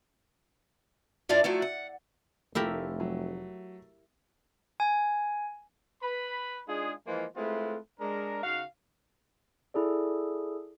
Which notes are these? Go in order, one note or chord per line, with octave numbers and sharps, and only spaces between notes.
G2 D4 E4 F4 D5
F3 F#3 A3 E4
F#5
F1 A3 E4 F4 G4 A#4
F#3
G#5
B4 B5
G#3 D4 D#4 F4 G#4
E3 F3 G#3 A#3 F4
G#3 A3 C4 E4 F4 B4
G#3 D4 A#4
C#3 D#4 F#4 F5
E4 G#4 A4 D5